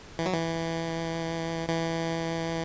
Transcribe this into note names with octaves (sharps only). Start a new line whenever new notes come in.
E3
F#3
E3
E3